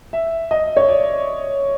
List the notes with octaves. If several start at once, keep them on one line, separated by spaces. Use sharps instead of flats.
E5
D#5
C#5
D5